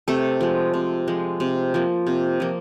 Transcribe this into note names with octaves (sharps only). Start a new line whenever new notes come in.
C3 A3 A4
F3 G#3
C3
F3 G#3
C3
F3 A#3
C3
F3 A#3